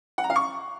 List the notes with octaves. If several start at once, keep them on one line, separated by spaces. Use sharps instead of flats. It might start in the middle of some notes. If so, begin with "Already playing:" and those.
F#5
A#5
F5
C#6